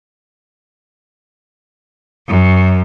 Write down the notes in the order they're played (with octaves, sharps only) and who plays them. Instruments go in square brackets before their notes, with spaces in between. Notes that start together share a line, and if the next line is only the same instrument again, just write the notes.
[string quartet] F#2